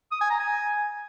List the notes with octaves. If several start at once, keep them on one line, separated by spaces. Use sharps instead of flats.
D#6
G#5
A#5
G#5